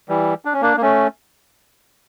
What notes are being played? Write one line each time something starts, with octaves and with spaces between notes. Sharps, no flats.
E3 G3
D4
C#4
A#3 D4
A#3
A3 C#4